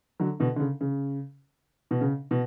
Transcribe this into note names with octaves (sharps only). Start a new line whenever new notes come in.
D3 F#3
B2 D3
D3
C#3
C#3
B2
C#3
B2